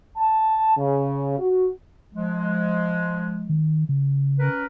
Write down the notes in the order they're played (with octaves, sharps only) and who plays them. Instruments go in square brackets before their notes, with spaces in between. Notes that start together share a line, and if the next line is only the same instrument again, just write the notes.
[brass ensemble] A5
C#3
F#4
[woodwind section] F3 G#3
[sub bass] D#3
C#3
[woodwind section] C#4 A#4 B4